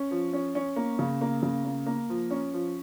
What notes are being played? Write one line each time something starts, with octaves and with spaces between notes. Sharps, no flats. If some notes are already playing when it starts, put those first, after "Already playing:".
Already playing: C#4
F3
C#4
C#4
A#3
C#3
A#3
C#3
A#3
A#3
F3
C#4
F3